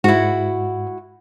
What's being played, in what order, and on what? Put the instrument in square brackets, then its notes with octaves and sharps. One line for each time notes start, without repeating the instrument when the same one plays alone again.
[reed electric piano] G#2 [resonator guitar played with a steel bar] E4 F#4